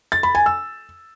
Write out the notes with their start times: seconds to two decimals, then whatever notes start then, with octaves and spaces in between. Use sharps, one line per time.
0.12 A6
0.23 B5
0.35 G#5
0.46 E6